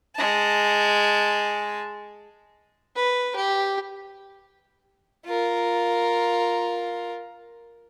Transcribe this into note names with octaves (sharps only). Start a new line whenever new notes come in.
G#3 A5
B4
G4
F4 A#4